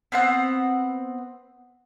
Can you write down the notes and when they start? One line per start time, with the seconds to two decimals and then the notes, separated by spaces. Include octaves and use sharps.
0.12 B3 C4 F#5